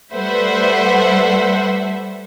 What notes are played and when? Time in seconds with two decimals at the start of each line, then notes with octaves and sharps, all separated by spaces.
0.14 G3 A3 B4 C5 E5 F#5